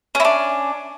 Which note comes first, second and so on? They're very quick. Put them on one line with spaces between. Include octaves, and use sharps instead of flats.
C#4 E4 D4